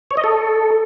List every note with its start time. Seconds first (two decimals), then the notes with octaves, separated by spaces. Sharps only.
0.11 C#5
0.17 D#5
0.24 A4